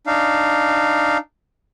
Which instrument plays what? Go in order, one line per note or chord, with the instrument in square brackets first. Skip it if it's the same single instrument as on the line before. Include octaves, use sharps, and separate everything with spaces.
[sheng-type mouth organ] D4 D#4 F5